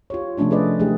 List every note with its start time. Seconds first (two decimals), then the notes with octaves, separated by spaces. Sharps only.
0.10 F4 G4 C#5
0.38 C3 F3 A3 C#4 D4 F4
0.50 F3 G#4 B4 D5 D#5
0.79 E3 G#3 A3 D4 G4 G#4